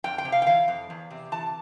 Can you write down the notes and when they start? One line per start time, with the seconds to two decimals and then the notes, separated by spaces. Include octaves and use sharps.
0.04 F2 G5
0.18 G5
0.25 C3
0.32 F5
0.42 G5
0.47 E3 F5
0.68 F2
0.90 E2
1.11 C3
1.32 E3 A5